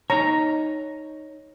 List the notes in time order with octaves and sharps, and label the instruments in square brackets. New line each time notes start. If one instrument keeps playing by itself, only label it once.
[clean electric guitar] D#4 C#5 [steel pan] A#5